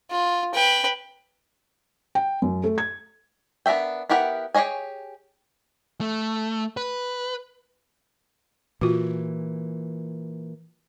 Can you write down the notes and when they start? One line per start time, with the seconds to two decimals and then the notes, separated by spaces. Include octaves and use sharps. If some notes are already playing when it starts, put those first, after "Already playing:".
0.10 F4
0.54 B4 G5
2.15 G5
2.42 F#2
2.64 A3
2.78 G#6
3.66 B3 D4 A#4 E5 G5
4.09 B3 E4 G4 A#4 F#5
4.54 G4 G#4 C#5 D#5 G#5
6.01 A3
6.77 B4
8.81 A#2 E3 F4 F#4